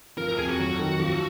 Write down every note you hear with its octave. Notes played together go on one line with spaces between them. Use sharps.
F3 A#4
A#4
F2 G#4
F#4
F#3
D#3
F3